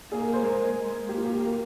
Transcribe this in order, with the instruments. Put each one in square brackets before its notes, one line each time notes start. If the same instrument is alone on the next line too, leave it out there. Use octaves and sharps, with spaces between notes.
[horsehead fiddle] A#3 [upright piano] G#4
[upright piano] A#4
C5
[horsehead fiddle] G#3 [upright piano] A#4
[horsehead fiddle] A#3 [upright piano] G4
[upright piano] F4
G4
A#4